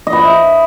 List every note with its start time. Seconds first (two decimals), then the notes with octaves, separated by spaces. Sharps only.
0.07 D#5
0.13 B4
0.19 D#5
0.25 E5